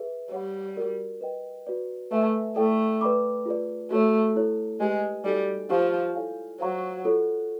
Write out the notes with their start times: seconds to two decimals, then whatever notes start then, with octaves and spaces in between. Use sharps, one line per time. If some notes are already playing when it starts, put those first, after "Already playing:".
Already playing: G#4 B4 E5
0.31 G3 C#5 F#5 B5
0.76 F#4 A#4 D5
1.21 B4 D#5 G5
1.67 F#4 B4 D5
2.11 A3 B4 E5 G#5
2.56 A3 E4 A4 D5 G5
3.01 B4 D5 G5 B5 D6
3.46 F4 G#4 B4 D5
3.91 A3 F#4 A4 C#5
4.36 E4 A4 C#5
4.80 G#3 G4 B4 D#5 G#5
5.25 G3 D#4 F#4 A4
5.70 F3 G4 C5 F5 A5 C#6
6.15 E4 A4 C#5 F5 G#5
6.60 F#3 C5 F5 A#5 C#6
7.05 F4 A4 C#5